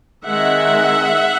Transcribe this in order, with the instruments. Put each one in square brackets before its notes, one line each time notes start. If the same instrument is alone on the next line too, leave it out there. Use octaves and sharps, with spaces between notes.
[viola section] D#3 G#3 C4 E5 F#5